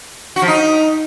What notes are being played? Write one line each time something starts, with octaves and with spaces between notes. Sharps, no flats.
F#4
F3
D#4